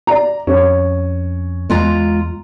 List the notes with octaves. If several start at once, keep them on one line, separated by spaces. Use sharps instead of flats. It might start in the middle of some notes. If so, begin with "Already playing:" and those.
D5 A#5
F2 C#4
E2 G#3 F4 A#5